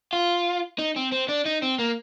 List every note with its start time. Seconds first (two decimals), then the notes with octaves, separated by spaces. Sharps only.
0.13 F4
0.79 D#4
0.97 C4
1.12 C4
1.29 D4
1.46 D#4
1.63 C4
1.79 A#3